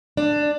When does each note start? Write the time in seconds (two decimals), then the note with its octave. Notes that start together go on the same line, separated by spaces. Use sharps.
0.17 D4